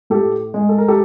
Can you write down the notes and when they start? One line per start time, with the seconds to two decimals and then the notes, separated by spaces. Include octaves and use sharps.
0.10 A2 G4 A4
0.54 G#3
0.69 A4
0.78 A#4
0.88 G4 A4